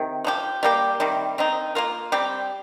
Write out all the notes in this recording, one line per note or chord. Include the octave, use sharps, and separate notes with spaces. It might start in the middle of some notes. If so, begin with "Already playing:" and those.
Already playing: C3 D#3
F3 D#4 G4
G3 A#3 G4
C3 D#3 G3
D#3 C4 D#4
A#3 F4 A#4
G3 C4 G4